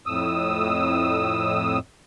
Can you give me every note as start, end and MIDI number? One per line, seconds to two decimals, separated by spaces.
0.06 1.79 41
0.06 1.79 45
0.06 1.79 87
0.06 1.79 88